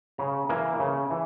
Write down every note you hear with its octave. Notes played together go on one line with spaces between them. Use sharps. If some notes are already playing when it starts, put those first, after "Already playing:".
C#3 A#5
E3 A#3
C#3
E3